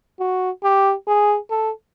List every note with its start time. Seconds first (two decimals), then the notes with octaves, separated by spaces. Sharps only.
0.20 F#4
0.64 G4
1.08 G#4
1.51 A4